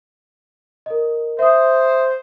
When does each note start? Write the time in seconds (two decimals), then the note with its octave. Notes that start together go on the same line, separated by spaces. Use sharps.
0.86 A#4 D#5
1.39 C5 E5 D#6